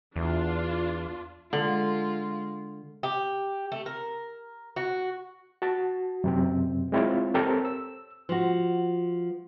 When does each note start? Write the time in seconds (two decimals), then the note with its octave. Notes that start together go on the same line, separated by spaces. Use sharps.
0.16 E2 D4 F4
1.53 D3 G#3 F4
3.03 G4
3.72 A3
3.86 A#4
4.76 F#4
5.62 F#4 A5
6.24 F#2 C3 C4
6.92 G#3 C4 E4 F4 C#5
7.35 C4 G4 A4 A#4 C#5
7.65 E6
8.29 F3 F#4